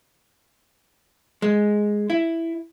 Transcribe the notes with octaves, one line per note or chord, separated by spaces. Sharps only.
G#3
E4